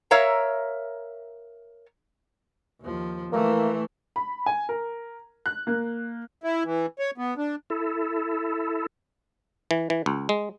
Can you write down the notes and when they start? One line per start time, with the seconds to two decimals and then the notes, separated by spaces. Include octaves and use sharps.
0.11 A#4 C#5 E5 F5 A#5
2.82 D#2 F3
3.32 E3 A3 A#3
4.16 B5
4.46 G#5
4.69 A#4
5.46 F#6
5.67 A#3
6.44 E4
6.65 E3
6.99 C#5
7.18 B3
7.38 D4
7.70 E4 A4
9.71 E3
9.90 E3
10.06 C#2
10.29 G#3